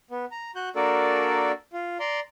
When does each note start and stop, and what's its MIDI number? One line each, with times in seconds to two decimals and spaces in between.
0.11 0.25 59
0.31 0.51 82
0.55 0.69 66
0.55 0.69 90
0.55 0.69 91
0.76 1.52 58
0.76 1.52 62
0.76 1.52 66
0.76 1.52 69
0.76 1.52 70
0.76 1.52 74
1.73 1.98 65
2.00 2.20 74
2.00 2.20 82
2.00 2.20 84